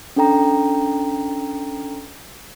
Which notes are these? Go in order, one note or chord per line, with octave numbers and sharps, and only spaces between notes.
C#4 D4 A4 G5 A#5